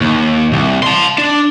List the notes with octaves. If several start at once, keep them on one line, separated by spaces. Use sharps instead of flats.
D#2
C2
A5 C6
D4